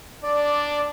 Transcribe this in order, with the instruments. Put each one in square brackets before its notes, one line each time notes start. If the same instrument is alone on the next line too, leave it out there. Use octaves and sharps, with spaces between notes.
[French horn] D4 [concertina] D5